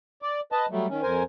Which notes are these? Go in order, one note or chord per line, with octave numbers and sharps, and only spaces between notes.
D5
B4 D#5 A5
F#3 G3 A3
D#3 C#4
F2 A#4 C5 G#5